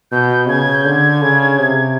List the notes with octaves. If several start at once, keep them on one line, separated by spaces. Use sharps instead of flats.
B2 G6
C#3 G#6
G6
D3 G#6
C#3
C3